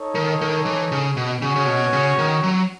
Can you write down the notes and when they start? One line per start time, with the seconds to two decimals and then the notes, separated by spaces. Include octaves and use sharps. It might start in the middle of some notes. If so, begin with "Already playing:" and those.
Already playing: D#4 A4 C#5
0.15 D#3
0.41 D#3
0.66 E3
0.92 C#3
1.17 B2
1.41 C#3 C#4 F#4 C#5
1.56 C#3
1.67 B2
1.93 C#3
2.18 D#3
2.43 F#3